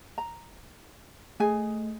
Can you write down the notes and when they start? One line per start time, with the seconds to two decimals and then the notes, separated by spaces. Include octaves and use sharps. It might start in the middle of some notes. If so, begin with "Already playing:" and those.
0.18 A#5
1.40 A3 G#4 G#5